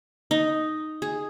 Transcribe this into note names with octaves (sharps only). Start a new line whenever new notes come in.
D#4
G#4